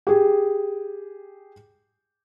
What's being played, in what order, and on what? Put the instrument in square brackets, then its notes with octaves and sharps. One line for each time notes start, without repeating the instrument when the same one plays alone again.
[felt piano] G4 G#4